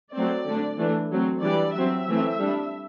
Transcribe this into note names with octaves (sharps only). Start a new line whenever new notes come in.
F#3 A3 C4 D5
D3 A3 D4
E3 A3 D4
F#3 A3 C4
E3 G3 D4 D5
F#3 C4 E5
E3 A3 C4
G3 D4